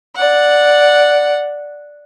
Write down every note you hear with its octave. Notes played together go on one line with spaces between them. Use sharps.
D5 F#5